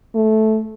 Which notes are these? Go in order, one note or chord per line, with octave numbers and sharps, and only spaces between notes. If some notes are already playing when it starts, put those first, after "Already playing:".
A3